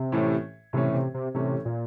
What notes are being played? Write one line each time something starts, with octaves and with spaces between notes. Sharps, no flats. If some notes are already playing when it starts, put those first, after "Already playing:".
Already playing: C3
A2 E3 A3 C#4
A2 C3 E3 A3 C#4
C3
C3
A2 C3 E3 A3 C#4
A#2